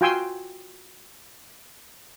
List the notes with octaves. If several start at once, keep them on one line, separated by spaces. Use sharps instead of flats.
F4 F#4 G5 G#5 C6 E6